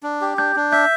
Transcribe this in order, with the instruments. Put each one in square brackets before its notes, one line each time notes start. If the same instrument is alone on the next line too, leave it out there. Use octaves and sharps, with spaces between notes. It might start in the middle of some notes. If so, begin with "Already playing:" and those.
[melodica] D4
G4
[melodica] D4 [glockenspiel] G6
[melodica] D4
[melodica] E5 [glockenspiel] G6